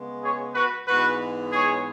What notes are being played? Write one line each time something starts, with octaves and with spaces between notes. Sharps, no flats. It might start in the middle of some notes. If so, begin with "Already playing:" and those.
Already playing: C#3 G#3 B3
G#4 C#5
F#4 B4
G#2 E3 G#3 B3 F#4 B4
G#4 C#5